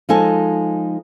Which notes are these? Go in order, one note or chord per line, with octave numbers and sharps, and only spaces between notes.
F3 G#3 D#4 A4 G#5 A5